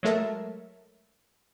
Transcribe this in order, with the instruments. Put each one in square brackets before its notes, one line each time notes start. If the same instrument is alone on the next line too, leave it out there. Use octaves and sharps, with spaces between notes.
[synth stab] F#3 G#3 A3 A4 A#4 E5